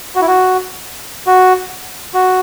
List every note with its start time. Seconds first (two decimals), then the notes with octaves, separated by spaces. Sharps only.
0.15 F#4
0.22 E4
0.27 F#4
1.27 F#4
2.14 F#4